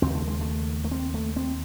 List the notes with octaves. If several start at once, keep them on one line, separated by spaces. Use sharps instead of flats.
D#2 C#3 C4
A3
G#3
A3
A3
C4
A3
C4